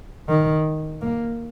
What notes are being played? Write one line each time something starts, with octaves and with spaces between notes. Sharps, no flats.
D#3
A#3